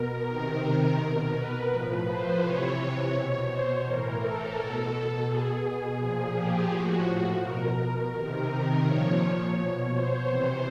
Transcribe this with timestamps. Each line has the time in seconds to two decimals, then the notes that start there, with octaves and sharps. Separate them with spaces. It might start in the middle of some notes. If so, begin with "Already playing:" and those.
Already playing: B2 A#4
0.28 C3 D#3 A#4
0.99 B2 A#4
1.35 B4
1.71 A2 F3
2.07 C5
2.42 C3 E3 C#5
3.13 B2 C#5
3.49 C5
3.85 A2 E3 A#4
4.20 A4
4.56 B2
5.28 B2 G#4
5.63 G#4
5.99 A#2 F3
6.34 G4
6.71 A2 F3 F#4
7.41 B2 A#4
8.13 C3 D#3
8.84 A#2 F3 C#5
9.56 B2 C#5
9.92 C5
10.27 C3 E3